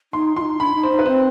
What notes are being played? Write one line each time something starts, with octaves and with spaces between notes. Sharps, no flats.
D#4 C6
D#4 F4 C6
D4 B5
D#4
C5
D#4
B4
C4 C5